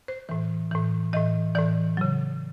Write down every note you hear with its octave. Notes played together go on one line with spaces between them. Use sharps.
C5
A2 E3
A2 E3
A2 E3 D#5
A2 E3 D5
C#3 F#3